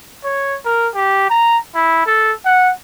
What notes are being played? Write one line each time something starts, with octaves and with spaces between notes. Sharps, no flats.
C#5
A#4
G4
A#5
E4
A4
F#5